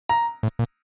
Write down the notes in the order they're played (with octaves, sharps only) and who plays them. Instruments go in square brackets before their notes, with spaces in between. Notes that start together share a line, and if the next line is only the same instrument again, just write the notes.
[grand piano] A#5
[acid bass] A2
A#2